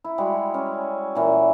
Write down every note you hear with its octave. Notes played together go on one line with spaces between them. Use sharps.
E4
G3 G#3 F#4
C#4
A#2 E3